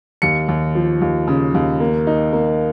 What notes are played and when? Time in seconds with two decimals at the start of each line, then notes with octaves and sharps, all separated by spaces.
0.22 D#2 C#7
0.48 D#2
0.75 F3
1.01 D#2
1.28 C#3
1.54 D#2
1.80 A#3
2.07 D#4
2.33 A#3